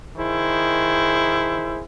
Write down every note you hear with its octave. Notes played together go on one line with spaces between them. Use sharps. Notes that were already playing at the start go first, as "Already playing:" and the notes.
D#3 E4 G#4 C5